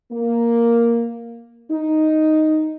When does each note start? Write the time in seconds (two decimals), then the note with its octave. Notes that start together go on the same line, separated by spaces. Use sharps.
0.12 A#3
1.71 D#4